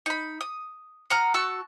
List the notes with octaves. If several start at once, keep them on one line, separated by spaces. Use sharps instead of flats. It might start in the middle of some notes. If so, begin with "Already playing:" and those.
D#4 B5
D#6
F#5 A#5 D#6 F6
F#4 A5 C#6 E6